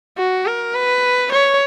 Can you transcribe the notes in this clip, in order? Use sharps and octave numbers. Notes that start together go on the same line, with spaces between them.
F#4
A#4
B4
C#5